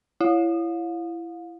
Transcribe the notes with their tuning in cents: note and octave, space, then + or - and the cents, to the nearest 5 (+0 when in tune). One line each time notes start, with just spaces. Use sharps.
E4 +25 F5 +35